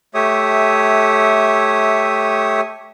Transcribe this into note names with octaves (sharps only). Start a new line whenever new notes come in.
A3 G4 C#5 E5 D#6